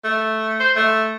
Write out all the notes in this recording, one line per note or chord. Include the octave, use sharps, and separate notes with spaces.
A3
C5
A3